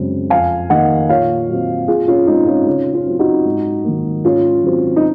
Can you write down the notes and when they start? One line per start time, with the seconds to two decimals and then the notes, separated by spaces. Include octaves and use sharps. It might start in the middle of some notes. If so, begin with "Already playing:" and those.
Already playing: F#2 C#3 G#3 C4
0.30 F2 F5 G#5
0.70 D#3 A#3 D#5 F#5
1.09 A#2 C#5 F5
1.49 F#3 C4
1.88 A#2 F4 G#4
2.08 C#4 F4
2.27 G#3 C4 D#4
2.47 C#4 F4
2.66 C#3 C#4 F4
2.93 C#4 F4
3.06 F#3 C4
3.19 D#4 F#4
3.45 G#2
3.84 D#3 F#3 A#3
4.24 G#2 C#4 F4
4.63 D#3 F#3 C4
4.96 D#4